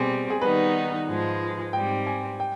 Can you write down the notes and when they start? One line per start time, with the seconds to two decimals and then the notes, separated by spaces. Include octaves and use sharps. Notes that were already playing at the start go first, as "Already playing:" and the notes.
Already playing: B2 G3 C4 G#4
0.30 G#4
0.41 D#3 G3 B3 D#4 B4
1.08 G#2 F3 G#3
1.73 G#2 G3 C4 G5
2.07 G#5
2.40 G5